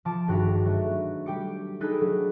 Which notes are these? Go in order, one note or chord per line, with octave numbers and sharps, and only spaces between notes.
F3 A5 D6
G#1 G2 D4 F#4 B4 A#5
F#3 A3
G3 G4 G5 D6 C#7
D4 D#4 G#4 A4 B4
F#3